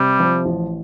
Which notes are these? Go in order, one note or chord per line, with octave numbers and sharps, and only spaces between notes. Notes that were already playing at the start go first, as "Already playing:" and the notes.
Already playing: C3 G3
F3
A1